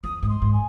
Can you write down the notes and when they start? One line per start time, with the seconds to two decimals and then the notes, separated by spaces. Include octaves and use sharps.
0.04 F2 D#6
0.23 G#2 D#6
0.29 C6
0.42 G#2
0.53 G#5